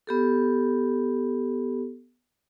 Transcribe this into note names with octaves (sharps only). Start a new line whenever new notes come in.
B3 G4 A4